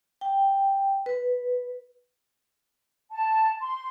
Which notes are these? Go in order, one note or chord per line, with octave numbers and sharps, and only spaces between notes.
G5
B4
A5
C6